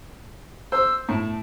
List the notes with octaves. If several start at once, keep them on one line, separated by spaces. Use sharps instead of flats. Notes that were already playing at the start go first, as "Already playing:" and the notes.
C5 E6
A2 A5